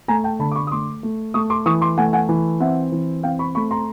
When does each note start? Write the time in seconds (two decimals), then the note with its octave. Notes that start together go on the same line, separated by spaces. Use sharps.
0.08 A3 G#5 A#5
0.24 G5 A5
0.39 D3 A5 B5
0.52 D6
0.56 B5 C#6
0.67 D#6
0.72 A3 C6 D6
1.03 A3
1.34 A3 C#6 D#6
1.50 C6 D6
1.66 E3 C#6 D#6
1.82 C6 D6
1.98 A3 F#5 G#5
2.13 F#5 G#5
2.29 E3
2.60 C4 E5 F#5
2.92 E3
3.23 C4 F5 G5
3.39 B5 C#6
3.55 A3 B5 C#6
3.71 A#5 C6